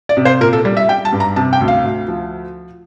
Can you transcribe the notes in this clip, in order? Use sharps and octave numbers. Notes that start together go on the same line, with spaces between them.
D5
C3
C5
A#2 A#4
A4
G3
E5
G3 G5
A5
G2
A#5
C3 A5
G5
D2
F5
D2
F3